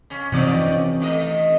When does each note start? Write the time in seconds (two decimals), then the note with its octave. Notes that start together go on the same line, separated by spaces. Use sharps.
0.10 C#3 C#4
0.32 C3 E3 F3 C4 D#4 D5
0.65 C#4
1.00 D#3 A3 D#5